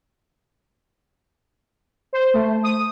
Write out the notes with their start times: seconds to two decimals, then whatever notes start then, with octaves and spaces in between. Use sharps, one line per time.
2.13 C5
2.34 A3
2.63 D#6